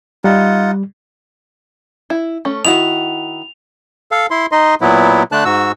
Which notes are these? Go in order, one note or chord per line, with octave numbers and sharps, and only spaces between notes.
G3 D#4 F4 F#5
E4
A3 C#4
D#3 E4 F#4 F7
A4 F5
E4 C6
D#4 D#5 C6
A#2 F#3 B3 E4
D3 A3 D4 A5 F#6
G#2 F#4 E6